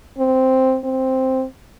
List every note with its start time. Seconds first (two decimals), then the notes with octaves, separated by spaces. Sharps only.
0.18 C4
0.84 C4